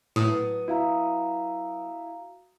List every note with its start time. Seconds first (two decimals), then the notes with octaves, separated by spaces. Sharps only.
0.16 A2 F#3 B3 D#6
0.68 E4 F#4 F5 A#5